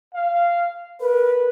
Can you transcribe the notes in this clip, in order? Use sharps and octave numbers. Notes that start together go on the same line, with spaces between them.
F5
A#4 B4